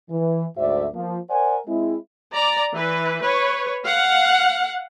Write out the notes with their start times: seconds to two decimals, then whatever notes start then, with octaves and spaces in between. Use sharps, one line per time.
0.10 E3
0.57 D2 G#2 F#4 C5 D5 E5
0.94 F3 A#3
1.30 A#4 C5 D5 F#5 G#5
1.67 G#3 C4 E4
2.33 D5 A#5
2.74 E3 B4
3.22 B4 C#5
3.84 F5 F#5